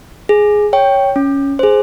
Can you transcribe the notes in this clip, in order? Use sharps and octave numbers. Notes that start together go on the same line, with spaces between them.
G#4
C#5 G5
C#4
G#4 C5